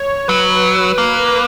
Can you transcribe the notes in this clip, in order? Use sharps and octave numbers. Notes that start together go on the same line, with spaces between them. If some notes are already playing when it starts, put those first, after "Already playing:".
Already playing: C#5
F#3 B4
A#3